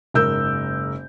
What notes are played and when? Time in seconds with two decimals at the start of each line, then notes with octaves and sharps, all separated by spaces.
0.14 F#1 G#2 A#4 E6 G6